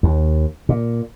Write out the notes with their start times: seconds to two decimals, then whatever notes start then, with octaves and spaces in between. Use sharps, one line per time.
0.03 D#2
0.69 A#2